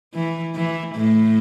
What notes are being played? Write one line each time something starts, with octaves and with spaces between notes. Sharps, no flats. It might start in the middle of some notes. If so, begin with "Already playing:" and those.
E3
E3
A2